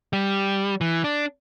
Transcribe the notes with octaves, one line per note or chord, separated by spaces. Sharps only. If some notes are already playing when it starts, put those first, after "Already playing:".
G3
E3
D4